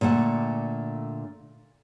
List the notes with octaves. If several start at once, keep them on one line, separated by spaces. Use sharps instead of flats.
A#2 D3 A3 F#5 A5